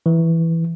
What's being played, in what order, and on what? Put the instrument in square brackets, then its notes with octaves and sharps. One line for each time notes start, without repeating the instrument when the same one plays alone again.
[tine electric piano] E3